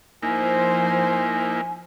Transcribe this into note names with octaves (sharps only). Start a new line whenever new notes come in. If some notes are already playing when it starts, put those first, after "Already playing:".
F3 A#3 D#4 E4 C5 G#5